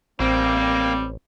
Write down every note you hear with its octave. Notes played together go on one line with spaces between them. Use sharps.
A1 G3 A#3 C4